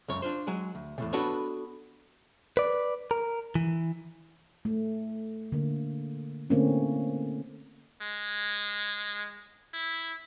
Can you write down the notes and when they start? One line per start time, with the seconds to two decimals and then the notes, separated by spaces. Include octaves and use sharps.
0.08 C#2 F#2 C#5
0.22 D4 F4 C5
0.47 F#3 G#3 G#4
0.75 D2
0.98 E2 A2 C3
1.13 B3 D4 F#4 A4 B4 C#5
2.57 B4 D5
3.11 A#4
3.55 E3
4.65 A3
5.52 D3 A#3
6.50 D3 A3 A#3 C4 C#4 E4
8.01 G#3
9.74 E4